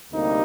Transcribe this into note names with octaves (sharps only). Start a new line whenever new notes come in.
D2 C3 G3 A#3 D#4